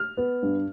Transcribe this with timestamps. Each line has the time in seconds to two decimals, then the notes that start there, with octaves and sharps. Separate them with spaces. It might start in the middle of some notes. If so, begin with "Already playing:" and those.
Already playing: F6
0.17 B3
0.43 G2